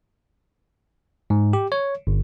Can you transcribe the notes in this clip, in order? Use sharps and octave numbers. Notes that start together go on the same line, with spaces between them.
G#2
G4
C#5
G1